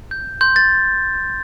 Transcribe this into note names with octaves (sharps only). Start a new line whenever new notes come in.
G6
C6 G6
A6